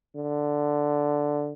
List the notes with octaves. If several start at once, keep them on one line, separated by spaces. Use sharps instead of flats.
D3